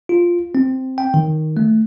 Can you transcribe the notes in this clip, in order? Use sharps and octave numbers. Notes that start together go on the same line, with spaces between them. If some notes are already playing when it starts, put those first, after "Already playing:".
F4
C4
G5
D#3
A3